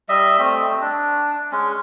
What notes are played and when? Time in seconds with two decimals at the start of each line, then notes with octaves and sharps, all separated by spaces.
0.09 G3 D#5 E5
0.39 A3 C4
0.81 D4
1.52 G#3 C#4